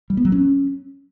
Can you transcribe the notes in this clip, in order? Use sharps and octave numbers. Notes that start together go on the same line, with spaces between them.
G3
B3
F#3
C#4